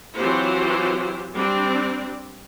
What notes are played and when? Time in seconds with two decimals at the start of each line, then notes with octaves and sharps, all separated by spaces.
0.17 E3 F#3 C4 F4 G4 C5
1.36 G3 C4 D4